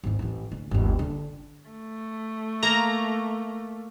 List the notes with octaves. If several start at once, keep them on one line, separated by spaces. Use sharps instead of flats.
G#1 E2
A1 E3
D2
G1 D#2
D3
A3
A#3 A#5